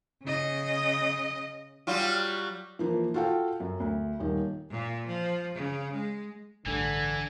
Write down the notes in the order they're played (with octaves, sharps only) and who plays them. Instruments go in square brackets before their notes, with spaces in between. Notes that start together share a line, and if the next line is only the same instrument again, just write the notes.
[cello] C#3 D#5
[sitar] F#3 G3 F4
[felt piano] E3 F3 A#3
F4 F#4 A4 F5 G5
F#2
D2
D#1 D#3
[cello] A#2
F3
C#3
G#3
[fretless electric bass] A1 G2 [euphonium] D3 [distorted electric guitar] E3 [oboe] G#5